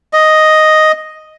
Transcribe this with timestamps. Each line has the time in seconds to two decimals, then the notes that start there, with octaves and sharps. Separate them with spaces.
0.13 D#5